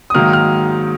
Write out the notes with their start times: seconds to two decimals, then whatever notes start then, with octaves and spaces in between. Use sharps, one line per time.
0.10 D#6
0.14 G#2 D#3 F#3 A#3 F6
0.33 F6